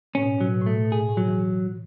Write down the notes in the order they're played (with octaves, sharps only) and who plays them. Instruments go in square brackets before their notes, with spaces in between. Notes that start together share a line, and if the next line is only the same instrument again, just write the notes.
[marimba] A2 [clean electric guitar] C#4
[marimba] B2
A2
[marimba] B2 [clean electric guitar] F#3
[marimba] A2
B2
A2
[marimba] B2 [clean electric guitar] A3
[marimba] A2
B2
[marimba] A2 [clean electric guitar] G#4
[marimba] B2
A2
[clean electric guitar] F#3
[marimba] E3